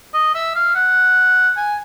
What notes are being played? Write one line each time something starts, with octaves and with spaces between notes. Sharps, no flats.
D#5
E5
F5
F#5
G#5